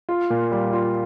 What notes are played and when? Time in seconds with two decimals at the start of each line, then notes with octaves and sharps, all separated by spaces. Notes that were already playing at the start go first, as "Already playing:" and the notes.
0.09 F4
0.30 A#2
0.52 G3
0.73 F4